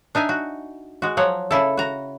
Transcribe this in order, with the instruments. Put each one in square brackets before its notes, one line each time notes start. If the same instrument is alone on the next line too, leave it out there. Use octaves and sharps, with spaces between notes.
[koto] D4 D#4 E5 G#5
F#4
G#3 F#4
F3 F#3 C#5 F#5
C#3 E4 A4
F#4 A#5